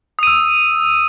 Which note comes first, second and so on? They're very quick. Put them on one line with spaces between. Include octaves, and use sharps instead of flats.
D#6 D#7 E6